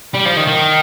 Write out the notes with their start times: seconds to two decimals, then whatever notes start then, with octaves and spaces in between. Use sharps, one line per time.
0.14 G3
0.25 F3
0.36 D#3
0.47 D#3